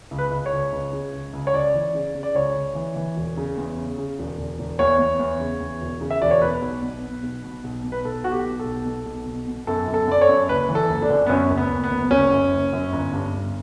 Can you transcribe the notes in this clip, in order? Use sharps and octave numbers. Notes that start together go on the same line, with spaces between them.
C#2
B4
C#2
C#5
C#2
C#2
C#3
C#2
C#2
C#5
C#2 D5
E3
C#3
C#3
D5
C#2 C#5
C#2
E3
E3
E1
C#3
E2
C#3
C#3
E1
E1
E1
E2 C#5
E2
E2
C#3
E2
E1
C#3
E5
E1 D5
C#5
B2 B4
B1
B2
B2
B1
B2
B1
B2
B4
B1 A4
B1 F#4
G4
B2
A4
B1
B2
B1
B2
B2
F#2 A4
F#2
A4
F#2 D5
C#5
F#2
F#1 B4
E3
A4
F#1
D4
F#2
B3
F#2 C#4
F#1
B3
F#1
B3
F#1
F#1 C#4
F#2
F#1
F#2
G1
G2
G1